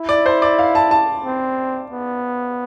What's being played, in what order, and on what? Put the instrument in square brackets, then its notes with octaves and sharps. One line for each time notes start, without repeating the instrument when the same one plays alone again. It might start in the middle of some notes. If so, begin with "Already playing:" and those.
Already playing: [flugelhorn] E4
[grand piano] D5
C5
D5
F5
A5
A5
[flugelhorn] C4
B3